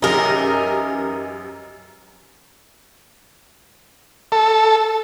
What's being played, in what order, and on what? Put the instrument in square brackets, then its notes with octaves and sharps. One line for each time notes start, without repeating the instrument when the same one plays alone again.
[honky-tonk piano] F#2 G4 G#4 [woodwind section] E3 C#4 [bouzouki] D#4 A#4
[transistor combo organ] A4